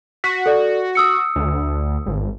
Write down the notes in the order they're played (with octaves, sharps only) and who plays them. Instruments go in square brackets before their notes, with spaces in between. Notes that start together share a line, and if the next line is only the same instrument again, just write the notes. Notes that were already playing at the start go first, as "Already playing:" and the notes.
[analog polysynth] F#4 [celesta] B6
[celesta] A4 D5
D#6 E6 C#7
[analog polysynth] D2
G#1